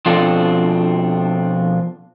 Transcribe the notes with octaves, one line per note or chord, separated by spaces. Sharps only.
B2 F3 C4 D4 F4 A4